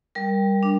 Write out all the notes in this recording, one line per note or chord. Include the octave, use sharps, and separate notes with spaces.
G3 A#4
D4